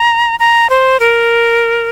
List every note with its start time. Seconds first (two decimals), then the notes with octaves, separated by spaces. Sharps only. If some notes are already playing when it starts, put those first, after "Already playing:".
Already playing: A#5
0.40 A#5
0.70 C5
1.00 A#4